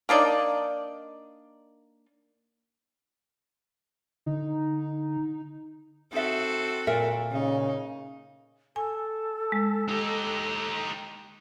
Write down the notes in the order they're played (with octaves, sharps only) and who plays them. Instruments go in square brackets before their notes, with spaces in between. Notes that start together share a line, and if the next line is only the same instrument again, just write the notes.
[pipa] A#3 D4 D#4 D5
[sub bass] D3 [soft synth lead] D#4
[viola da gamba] C4 F#4 A4 [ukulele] D#4 E5
[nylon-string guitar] A#2 [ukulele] A#4 E5
[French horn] C#3 [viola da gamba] D#4
[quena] A4 [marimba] G#5
[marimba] G#3
[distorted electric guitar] D#4 G4